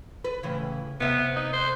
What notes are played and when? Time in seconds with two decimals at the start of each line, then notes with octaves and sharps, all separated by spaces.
0.24 B4
0.43 A2 C#3 E3
1.00 C3 B3 E5
1.36 D#4
1.53 C5